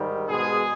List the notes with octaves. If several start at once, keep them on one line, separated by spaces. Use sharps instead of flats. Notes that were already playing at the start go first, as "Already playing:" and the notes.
Already playing: G#2 D#3 G3
B2 G#3 G#4